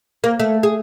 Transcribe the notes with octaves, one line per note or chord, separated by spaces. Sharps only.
A#3
A3
G#4